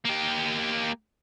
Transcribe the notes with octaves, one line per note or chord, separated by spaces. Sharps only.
A#3 G4